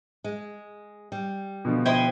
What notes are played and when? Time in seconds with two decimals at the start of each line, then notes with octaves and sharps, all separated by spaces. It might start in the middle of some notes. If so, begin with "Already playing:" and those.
0.24 G#3
1.12 G3
1.65 B2 D3 F3
1.86 E4 C5 D#5 G5